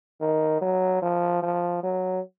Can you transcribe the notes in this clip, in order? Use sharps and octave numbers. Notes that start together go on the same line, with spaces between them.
D#3
F#3
F3
F3
F#3